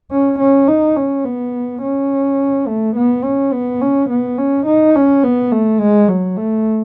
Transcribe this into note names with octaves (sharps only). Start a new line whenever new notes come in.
C#4
C#4
D#4
C#4
B3
C#4
A3
B3
C#4
B3
C#4
B3
C#4
D#4
C#4
B3
A3
G#3
F#3
A3